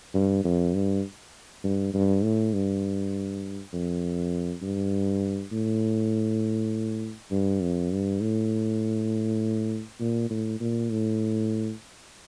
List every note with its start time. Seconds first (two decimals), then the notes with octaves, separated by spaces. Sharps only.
0.14 G2
0.44 F2
0.74 G2
1.64 G2
1.94 G2
2.23 A2
2.53 G2
3.73 F2
4.62 G2
5.52 A2
7.31 G2
7.61 F2
7.91 G2
8.21 A2
10.00 A#2
10.30 A2
10.60 A#2
10.90 A2